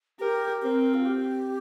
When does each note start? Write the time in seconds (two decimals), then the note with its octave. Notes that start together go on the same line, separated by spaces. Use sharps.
0.19 G4 A#4
0.62 C4 A#4
0.94 F4
1.05 G4